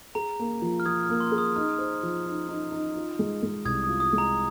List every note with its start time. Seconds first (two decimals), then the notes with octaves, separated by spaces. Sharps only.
0.15 G#4 A#5
0.39 A#3
0.62 F3
0.80 F6
0.86 F3 D#6 G#6
1.03 F6
1.09 A#3
1.20 C6
1.32 G#4
1.38 D#6
1.56 D#4 F6
1.79 C5
2.03 F3
2.26 D#4
2.49 D#4
2.72 D#4
2.96 F4
3.19 G#3
3.43 G#3
3.65 C2 D#6 G#6
3.84 F4 D#6
4.00 D#6
4.13 G#3
4.18 A#5